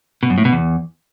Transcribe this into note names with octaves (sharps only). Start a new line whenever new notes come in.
B2
F#2
A2
B2
E2